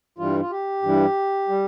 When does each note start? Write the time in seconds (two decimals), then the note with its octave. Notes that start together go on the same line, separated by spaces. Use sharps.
0.18 G2 E3 G3 F4
0.40 F4
0.51 G4
0.83 G2 E3 G3
1.48 G3